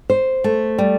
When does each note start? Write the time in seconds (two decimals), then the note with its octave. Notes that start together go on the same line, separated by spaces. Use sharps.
0.10 C5
0.44 A3
0.78 G3